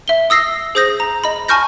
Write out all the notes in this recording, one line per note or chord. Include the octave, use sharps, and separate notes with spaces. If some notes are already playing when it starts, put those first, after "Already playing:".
E5 G7
D#6 E6 A#6 C7
G#4 C5 D#6 G6 A#6
A#5
D#5 B5
G#5 A5 C#6 F6 G6 A#6